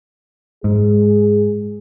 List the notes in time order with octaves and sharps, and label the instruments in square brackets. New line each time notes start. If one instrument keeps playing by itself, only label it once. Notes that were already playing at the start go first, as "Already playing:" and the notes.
[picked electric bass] G#2 [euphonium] G#4